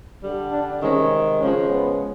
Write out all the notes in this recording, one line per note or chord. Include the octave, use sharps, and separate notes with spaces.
D3 G3
D4
C3 D#3 G#3 C#4
C#3 F3 G#3 C#4
B3